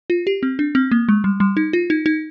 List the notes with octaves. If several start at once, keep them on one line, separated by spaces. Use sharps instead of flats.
F4
G4
C4
D4
C4
A#3
G#3
G3
G3
D#4
F4
D#4
D#4